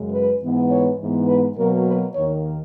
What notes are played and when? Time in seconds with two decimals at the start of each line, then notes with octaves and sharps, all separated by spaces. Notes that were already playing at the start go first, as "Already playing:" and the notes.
Already playing: F#2 C#3 G#3
0.11 B4
0.41 G#2 E3 B3
0.70 C#5
0.99 G#2 E3 B3
1.28 B4
1.57 B2 F#3 A#3 A#4
1.86 B4
2.15 D#2 D#3 A#3 C#5